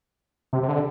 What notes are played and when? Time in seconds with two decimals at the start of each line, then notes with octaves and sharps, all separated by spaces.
0.53 C3
0.63 C3
0.68 D3